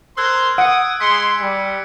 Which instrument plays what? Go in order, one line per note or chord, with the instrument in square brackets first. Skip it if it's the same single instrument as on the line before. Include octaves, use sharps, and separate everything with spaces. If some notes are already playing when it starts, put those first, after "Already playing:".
[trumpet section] A#4 C5 C6 [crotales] E6 F#6 G#6
[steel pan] F#5 [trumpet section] D#6 [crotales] D7
[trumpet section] G#3 C6 [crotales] B6 C#7
[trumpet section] G3